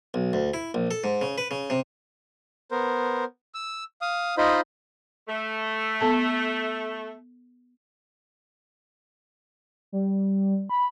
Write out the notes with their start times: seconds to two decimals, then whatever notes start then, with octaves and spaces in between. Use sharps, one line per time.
0.14 B1
0.33 D2
0.54 E4
0.74 A#1
0.91 A4
1.04 G#2
1.21 C#3
1.38 B4
1.51 C#3
1.70 C3
2.71 B3 A#4 C5
3.54 E6
4.01 F5 D#6
4.38 D#4 F4 C5 D#5 B5
5.28 A3
6.01 B3 A4 A5
9.92 G3
10.69 B5